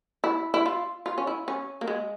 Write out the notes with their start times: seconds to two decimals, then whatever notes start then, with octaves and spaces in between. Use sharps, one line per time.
0.24 E4
0.54 E4
0.66 F4
1.06 F4
1.18 C#4
1.27 E4
1.48 C#4
1.81 A#3
1.88 G#3